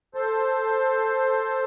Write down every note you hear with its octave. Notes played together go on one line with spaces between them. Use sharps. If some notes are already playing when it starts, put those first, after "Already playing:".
A4 C5